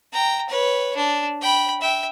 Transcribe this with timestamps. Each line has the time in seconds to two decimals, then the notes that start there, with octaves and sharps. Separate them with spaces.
0.13 G5 A#5
0.49 B4 C#5
0.96 D4
1.42 G5 B5
1.81 E5 G5